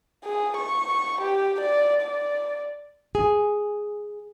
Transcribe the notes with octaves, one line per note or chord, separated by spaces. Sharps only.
G#4
C#6
G4
D5
D5
G#4